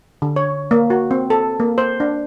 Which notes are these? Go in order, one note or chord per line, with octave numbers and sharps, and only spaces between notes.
D3
C#5
A#3
F#4
C4
A4
A#3
C5
D4